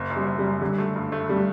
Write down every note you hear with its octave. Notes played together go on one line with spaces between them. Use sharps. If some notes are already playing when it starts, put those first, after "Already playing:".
Already playing: F#1
F#2
G3
F#1
G3
F#2
D3 G3
A3
G2
A3
G3